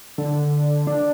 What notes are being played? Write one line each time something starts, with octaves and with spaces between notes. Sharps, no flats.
D3
D4